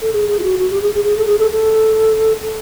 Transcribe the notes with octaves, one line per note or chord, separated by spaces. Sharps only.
A4
G#4
G#4
F4
F#4
F#4
G4
G#4
G#4
G#4
A4
G#4
A4
A4
A4